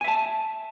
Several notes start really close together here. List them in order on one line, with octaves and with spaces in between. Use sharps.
G#5 E5 A5